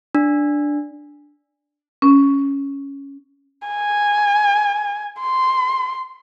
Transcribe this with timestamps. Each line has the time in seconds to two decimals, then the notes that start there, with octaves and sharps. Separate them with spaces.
0.15 D4
2.02 C#4
3.68 G#5
5.21 C6